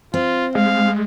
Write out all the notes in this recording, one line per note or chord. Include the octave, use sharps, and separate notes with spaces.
C4 F4
G#3 F5